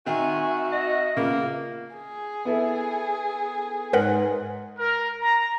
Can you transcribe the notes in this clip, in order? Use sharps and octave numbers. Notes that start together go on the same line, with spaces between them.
D#3 C4 F#4 E5 G#5
D#5
C#3 F3 A#3 B3
G#4
B3 E4 A4
G#2 A#4 B4 F#5
A#4
A#5